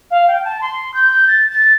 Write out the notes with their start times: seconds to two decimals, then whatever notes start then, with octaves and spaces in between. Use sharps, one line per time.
0.10 F5
0.27 G5
0.44 A5
0.61 C6
0.93 G6
1.27 A6
1.49 A6